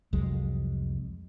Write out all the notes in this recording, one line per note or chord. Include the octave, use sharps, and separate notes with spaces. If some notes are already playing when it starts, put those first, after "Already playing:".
C2 F2 F#3 G#3